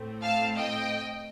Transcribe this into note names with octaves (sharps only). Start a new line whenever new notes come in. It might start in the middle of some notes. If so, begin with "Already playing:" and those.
Already playing: A2 A3 C4
F5 A5
D#5 G5